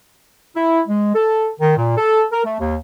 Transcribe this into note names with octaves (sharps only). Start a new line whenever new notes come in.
E4
G#3
A4
D#3
A#2
A4
A#4
A3
D#2